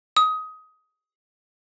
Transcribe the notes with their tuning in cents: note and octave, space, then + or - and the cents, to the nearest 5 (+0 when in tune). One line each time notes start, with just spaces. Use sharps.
D#6 +20